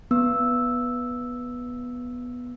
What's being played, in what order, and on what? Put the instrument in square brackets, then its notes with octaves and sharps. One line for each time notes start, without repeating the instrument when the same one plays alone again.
[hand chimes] B3 E6